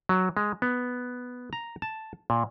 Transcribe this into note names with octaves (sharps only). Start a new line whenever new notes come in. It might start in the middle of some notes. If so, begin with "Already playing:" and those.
F#3
G#3
B3
A#5
A5
A#2